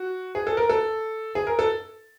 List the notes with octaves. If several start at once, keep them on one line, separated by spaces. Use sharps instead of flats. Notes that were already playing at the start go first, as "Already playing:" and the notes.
Already playing: F#4
G#4
A4
A#4
A4
G#4
A#4
A4